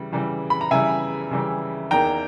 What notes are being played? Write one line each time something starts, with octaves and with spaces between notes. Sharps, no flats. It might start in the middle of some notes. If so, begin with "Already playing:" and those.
Already playing: C#3 E3 G3
C#3 E3 G3
B5
A#5
C#3 E3 G3 E5 G#5
C#3 E3 G3
E2 D#3 A#3 G5 A#5